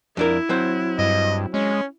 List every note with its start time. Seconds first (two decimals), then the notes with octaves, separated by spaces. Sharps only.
0.17 F2 D4 E4 A#4
0.49 F#3 C4 C5
0.99 G2 D#5
1.54 G#3 C#4